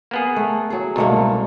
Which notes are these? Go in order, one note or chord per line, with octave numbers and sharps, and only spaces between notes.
A#3 B3 G#4
A3
F#3 G#4
C2 G#2 B2 A3 A#3